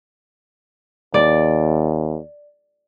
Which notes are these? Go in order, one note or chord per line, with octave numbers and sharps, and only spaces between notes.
D#2 D5